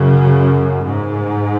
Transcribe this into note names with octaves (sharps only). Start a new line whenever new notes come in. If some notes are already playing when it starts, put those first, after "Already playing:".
Already playing: F#2 C#3
G#2